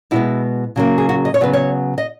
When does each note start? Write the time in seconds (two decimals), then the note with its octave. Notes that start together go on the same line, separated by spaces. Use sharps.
0.11 B2 G#3 B3 E4
0.76 C#3 F#3 A#3
0.98 G#4
1.09 F#4
1.25 D#5
1.34 C#5
1.41 C#3 F#3 B3 B4
1.53 C#5
1.98 D#5